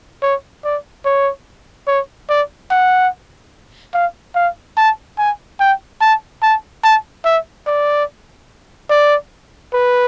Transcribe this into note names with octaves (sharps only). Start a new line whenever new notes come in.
C#5
D5
C#5
C#5
D5
F#5
F5
F5
A5
G#5
G5
A5
A5
A5
E5
D5
D5
B4